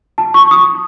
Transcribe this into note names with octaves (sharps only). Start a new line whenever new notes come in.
A5
C#6
D#6